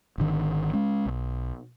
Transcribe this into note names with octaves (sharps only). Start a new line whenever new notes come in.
G#1 D3 D#3
G#3 C#4
B1